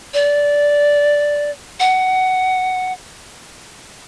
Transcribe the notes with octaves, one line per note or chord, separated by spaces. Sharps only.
D5
F#5